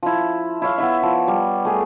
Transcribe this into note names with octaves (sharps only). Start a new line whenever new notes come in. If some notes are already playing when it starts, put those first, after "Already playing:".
F3 E4
E4 C#5 F5
B3 E4 E5
F3
G3
A3 G#4